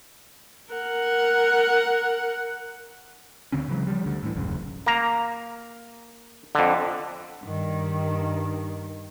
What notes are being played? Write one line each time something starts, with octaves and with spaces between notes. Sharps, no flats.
A#4 F#5
D2 D3 C4 C#4
C#3 E3 F#3 G#3
F3 G3
D2 D3
A2 E3
D#1 A1 F#2 C#3
A#3 A#5
F2 D3
G2 D#3